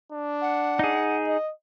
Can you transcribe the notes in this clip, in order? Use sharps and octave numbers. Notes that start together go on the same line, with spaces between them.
D4
F#5
D#4 G#4
D#5